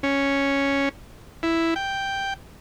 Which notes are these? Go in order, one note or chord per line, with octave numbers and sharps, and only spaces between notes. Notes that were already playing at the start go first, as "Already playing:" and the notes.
C#4
E4
G5